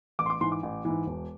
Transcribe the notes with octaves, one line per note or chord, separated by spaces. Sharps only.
A1 D6
C6
D6
G#2 E3 C6
D6
A1
G#2 E3
E1